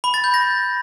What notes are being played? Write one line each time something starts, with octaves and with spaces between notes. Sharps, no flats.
B5
A6
G6
A#6